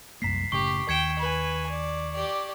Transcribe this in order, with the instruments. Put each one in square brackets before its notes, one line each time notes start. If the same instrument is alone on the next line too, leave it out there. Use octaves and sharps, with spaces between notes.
[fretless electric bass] C2 F#2 A#3 [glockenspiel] A#5 B6 C7
[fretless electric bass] F#1 A2 C#3 [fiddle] G4 [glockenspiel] C#6
[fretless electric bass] D#2 [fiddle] G5 [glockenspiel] G#6 C#7 E7
[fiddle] B4 G#5
D5
G4 D5